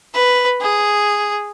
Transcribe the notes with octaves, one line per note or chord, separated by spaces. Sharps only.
B4
G#4